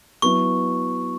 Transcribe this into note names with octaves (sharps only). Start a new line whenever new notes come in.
F#3 B3 E4 C#6